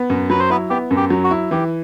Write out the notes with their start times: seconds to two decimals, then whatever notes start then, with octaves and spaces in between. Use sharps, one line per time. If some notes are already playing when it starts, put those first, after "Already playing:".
Already playing: B3
0.10 F#2
0.30 F#3 B4
0.40 C5
0.50 B3 E4 B4
0.70 B3 G4
0.91 F#2
0.97 G4
1.10 F#3
1.24 F#4
1.31 E4
1.51 E3 G4